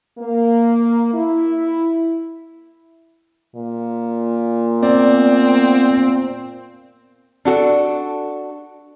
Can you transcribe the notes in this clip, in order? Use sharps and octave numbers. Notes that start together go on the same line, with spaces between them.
A#3
E4
A#2
B3 C4 D5
D4 F#4 G#4 A4